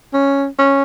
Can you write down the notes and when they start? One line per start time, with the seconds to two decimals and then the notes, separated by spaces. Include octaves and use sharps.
0.14 C#4
0.59 C#4